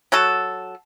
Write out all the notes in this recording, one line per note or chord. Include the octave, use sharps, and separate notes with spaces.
F#3 F#4 A4